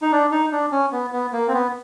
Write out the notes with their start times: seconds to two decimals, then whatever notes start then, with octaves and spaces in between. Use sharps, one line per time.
0.02 D#4
0.12 D4
0.32 D#4
0.52 D4
0.72 C#4
0.92 B3
1.12 B3
1.33 A#3
1.48 C4
1.53 B3